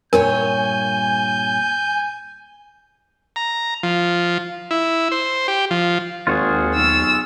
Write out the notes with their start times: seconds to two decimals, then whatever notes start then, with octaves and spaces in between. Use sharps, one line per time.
0.13 G2 A#2 A#4 C#5 G#5 G6
3.36 A#5
3.83 F3
4.71 E4
5.12 C5
5.48 G4
5.71 F3
6.27 G#1 D#2 F4 F#4 G#4
6.75 B1 E6